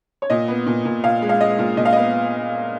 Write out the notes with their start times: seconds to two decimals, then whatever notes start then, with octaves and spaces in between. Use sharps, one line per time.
0.22 C#5
0.30 A#2 D#5
0.48 B3
0.66 A#2
0.85 A#2
1.04 A#2 F5
1.22 G#3
1.29 F5
1.41 G#3 D#5
1.58 A#2
1.77 A#2 D#5
1.85 F5
1.93 B3 D#5